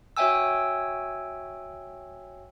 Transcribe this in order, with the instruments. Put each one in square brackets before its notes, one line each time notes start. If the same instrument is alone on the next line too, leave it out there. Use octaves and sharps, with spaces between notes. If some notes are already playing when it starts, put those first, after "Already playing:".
[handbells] F#4 C#5 E5 G5 G#5 E6